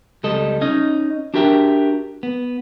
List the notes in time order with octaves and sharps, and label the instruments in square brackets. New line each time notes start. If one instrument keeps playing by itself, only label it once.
[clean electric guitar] C#2 G3 A4 D#5
C#4 D#4 D#5
D4 F#4 G4 A#4 E5 G5
B3